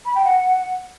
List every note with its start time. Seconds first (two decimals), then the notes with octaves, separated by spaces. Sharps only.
0.05 B5
0.15 G5
0.25 F#5